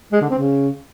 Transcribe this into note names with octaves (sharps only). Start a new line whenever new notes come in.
G#3
D3
C4
C#3